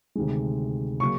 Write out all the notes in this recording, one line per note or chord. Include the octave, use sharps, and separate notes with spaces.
D2 C3 D#3 G#3
C#3 F#3 A#3 C#6